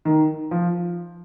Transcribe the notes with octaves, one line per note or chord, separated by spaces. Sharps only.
D#3
F3